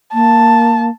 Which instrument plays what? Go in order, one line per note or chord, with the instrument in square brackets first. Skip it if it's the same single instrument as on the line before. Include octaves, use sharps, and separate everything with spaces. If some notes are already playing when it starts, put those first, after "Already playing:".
[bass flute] A#3 [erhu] A5